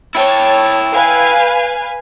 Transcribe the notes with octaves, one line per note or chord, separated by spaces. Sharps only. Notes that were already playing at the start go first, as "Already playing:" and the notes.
E4 C#5 G5 A5
B4 F5 G#5